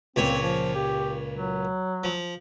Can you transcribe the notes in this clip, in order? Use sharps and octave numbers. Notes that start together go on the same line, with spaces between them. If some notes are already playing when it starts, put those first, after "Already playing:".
C#2 A#2 C4 C#5
F3
G4
F#3
F3